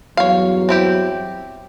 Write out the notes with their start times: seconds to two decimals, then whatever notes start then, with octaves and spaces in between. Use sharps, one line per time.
0.17 E2 G2 F#3 C#5 F5
0.69 C4 E4 G4